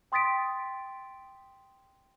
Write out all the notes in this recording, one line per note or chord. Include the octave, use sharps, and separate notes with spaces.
G5 C6 D#6 A6 B6 D7